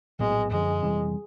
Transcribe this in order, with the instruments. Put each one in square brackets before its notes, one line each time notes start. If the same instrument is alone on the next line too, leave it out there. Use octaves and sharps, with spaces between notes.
[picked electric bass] A#1 A2 F#3 B3 [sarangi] G#3
[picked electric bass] F#2 D3 F3 [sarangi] G#3
[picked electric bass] F2 C3 E3 G3